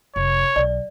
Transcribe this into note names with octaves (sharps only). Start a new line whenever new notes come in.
F1 C#5
B1 D5